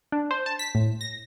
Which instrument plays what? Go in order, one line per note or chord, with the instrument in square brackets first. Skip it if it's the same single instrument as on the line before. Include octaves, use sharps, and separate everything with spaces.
[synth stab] D4
C5
A5
B6
A2
A#6